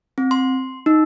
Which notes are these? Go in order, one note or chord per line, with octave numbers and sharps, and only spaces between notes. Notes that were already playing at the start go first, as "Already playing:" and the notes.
C4
C6
D#4